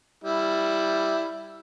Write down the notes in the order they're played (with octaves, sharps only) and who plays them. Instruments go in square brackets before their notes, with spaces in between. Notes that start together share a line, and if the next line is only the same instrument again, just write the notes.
[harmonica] G3 E4